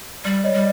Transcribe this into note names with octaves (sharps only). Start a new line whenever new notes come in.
G3 D5
C#5 D#5
G3